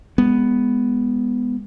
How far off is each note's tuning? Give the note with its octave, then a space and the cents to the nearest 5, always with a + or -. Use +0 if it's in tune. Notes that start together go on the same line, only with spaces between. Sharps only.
G#3 -15 B3 +0